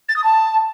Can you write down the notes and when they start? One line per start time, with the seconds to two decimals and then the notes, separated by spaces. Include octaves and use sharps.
0.09 A6
0.16 D#6
0.24 A5